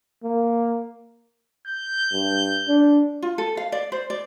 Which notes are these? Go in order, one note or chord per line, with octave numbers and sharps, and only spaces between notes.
A#3
G6
G2
D4
F4
A4
F5
D5
C5
D5